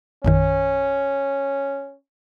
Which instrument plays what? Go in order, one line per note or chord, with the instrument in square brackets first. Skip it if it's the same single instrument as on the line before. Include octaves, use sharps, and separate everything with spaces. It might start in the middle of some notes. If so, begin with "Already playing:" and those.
[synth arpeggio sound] A#1 F#2 D#3 [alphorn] C#4